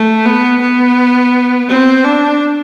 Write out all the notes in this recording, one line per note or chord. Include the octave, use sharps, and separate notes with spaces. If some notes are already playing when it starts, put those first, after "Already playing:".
Already playing: A3
B3
B3
C4
D4